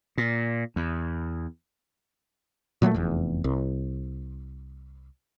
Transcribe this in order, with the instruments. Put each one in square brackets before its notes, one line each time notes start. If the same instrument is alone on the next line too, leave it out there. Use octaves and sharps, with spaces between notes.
[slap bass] A#2
E2
[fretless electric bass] A#2 F#3 G#3 A3
F1 E2
C2